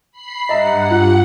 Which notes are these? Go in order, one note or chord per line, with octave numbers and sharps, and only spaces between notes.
B5 C7
G2 D#5 E5 F#5 A#5
F4